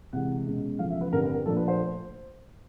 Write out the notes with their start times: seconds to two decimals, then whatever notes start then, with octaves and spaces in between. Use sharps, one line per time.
0.13 C3 E3 G#3 F#5
0.46 B2 G#3 C#4
0.79 E2 C#3 F3 A3 F5
0.90 E5
1.01 B4
1.12 G2 D3 G3 C4 A#4
1.24 B4
1.34 A#4
1.46 A#2 F3 A3 D4 A4
1.57 B4
1.68 C5